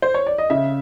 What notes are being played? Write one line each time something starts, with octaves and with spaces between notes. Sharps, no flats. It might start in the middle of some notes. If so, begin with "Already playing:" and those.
C5
C#5
D5
D#5
C#3 E5